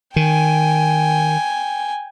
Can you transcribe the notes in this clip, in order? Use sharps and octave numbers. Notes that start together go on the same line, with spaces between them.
D#3 G5 G#5